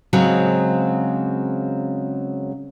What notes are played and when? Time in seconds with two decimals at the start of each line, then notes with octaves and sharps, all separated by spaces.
0.13 C#3 F#3 G#3 C4